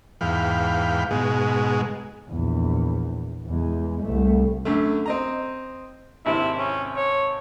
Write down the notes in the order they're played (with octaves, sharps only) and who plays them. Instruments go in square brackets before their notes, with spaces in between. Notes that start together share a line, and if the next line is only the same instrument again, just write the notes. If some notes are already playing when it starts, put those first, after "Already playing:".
[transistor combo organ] E2 G#2 F5 G5 B5
G#2 B2 G#3
[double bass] A#1 E2
E2 G#3
C2 A3
[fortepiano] F#2 D3 A3
C4 D#5 A#5
[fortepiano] G#1 C3 C4 [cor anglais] E4
[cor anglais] C#4
C#5